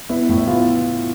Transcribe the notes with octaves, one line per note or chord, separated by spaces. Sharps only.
B3 E4
A2
E4
B3 F4